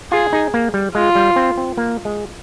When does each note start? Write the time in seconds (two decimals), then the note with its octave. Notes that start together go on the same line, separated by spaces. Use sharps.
0.12 F4 G#4
0.33 D#4
0.54 A#3
0.74 G3
0.95 G#3 F4
1.16 G3
1.36 C4
1.58 C4
1.78 A#3
2.05 G#3